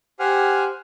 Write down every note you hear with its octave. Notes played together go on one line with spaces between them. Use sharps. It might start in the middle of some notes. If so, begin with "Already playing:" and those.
G4 C5 F#5 G#5 F6